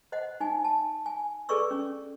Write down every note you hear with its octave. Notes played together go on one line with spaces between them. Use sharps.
C5 D#5 F#5
D#4 G#5
A5
G#5
G#4 A4 B4 D5 C#6 E6
C#4